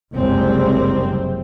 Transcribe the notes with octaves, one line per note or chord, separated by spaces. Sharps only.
F#1 C2 F#2 G3 G#3 C4